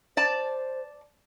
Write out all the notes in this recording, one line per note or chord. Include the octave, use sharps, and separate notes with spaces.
C5 D5 A5